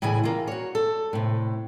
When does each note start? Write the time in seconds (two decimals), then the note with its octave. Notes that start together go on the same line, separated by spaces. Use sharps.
0.02 A2 C#3 E3 E4 G#5
0.24 A#3 F4
0.47 F#4 C#5
0.75 A4
1.13 A2 C3